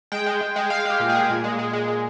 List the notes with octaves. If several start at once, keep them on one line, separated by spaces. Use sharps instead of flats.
G#3 G5
G#3
G#3
G#3
G#3 F5
G#3 G4
A#2
G#4
G#3
A#2
G#3
G#3
G#3
G#3